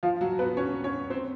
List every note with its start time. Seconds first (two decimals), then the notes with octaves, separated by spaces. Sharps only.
0.03 F3 F4
0.21 F#3 F#4
0.39 B3 B4
0.57 C#4 C#5
0.84 C#4 C#5
1.10 C4 C5